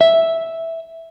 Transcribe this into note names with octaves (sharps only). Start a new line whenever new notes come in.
E5